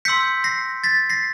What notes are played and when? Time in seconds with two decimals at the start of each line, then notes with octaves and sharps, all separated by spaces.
0.05 C6 E6 G6 B6 C#7
0.44 A#6 C7
0.84 A6 B6
1.10 A#6 C7